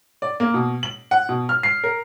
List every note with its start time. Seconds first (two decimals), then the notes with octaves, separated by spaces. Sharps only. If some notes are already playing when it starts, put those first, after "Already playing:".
0.22 D5
0.40 A#3
0.54 B2
0.83 F#7
1.11 F#5
1.29 B2
1.49 F6
1.63 C7
1.84 A#4